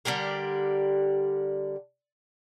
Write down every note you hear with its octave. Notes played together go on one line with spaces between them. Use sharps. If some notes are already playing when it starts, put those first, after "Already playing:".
D3 G3 G4 A#4